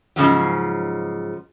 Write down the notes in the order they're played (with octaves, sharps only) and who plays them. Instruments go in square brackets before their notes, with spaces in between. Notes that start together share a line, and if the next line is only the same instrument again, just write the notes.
[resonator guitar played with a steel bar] G#2 C#3 F3 F#3